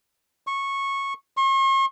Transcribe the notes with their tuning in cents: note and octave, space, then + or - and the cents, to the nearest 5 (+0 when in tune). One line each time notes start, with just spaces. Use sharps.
C#6 -15
C#6 -45